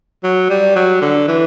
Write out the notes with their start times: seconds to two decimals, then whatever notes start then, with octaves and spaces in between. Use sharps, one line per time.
0.23 F#3
0.50 G3
0.76 F#3
1.02 D3
1.28 E3